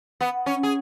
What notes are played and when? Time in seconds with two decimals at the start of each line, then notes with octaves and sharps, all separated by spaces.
0.21 B3
0.46 C#4
0.63 G#4